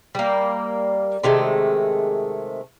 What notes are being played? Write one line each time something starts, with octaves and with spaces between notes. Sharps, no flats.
G3 A#3
C3 D#3 G#3 A3